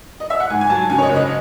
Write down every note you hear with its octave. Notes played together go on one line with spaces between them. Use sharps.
D#5
E5
F#5
G#2 G#5
G#5
F#3 A5
C#3 G#5
C#5
D#5
F#1
D#5